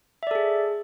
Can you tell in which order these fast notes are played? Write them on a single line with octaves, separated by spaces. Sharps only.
E5 D5 A4 G#4